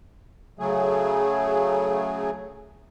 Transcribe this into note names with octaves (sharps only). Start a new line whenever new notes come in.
C#3 F#3 A3 G#4